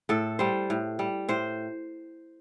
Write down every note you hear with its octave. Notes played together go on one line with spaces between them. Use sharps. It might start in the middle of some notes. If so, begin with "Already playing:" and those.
A2 A4
G3 C5
A2
G3
A2 C5